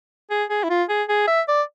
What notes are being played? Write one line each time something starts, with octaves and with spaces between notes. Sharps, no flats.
G#4
G#4
E4
F4
G#4
G#4
E5
D5